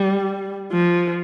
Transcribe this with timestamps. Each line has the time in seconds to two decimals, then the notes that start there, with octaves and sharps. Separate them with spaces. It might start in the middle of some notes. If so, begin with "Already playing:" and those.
Already playing: G3
0.72 F3